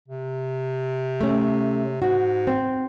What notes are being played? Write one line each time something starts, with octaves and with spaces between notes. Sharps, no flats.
C3
A3 C#4
G#2 F#4
C4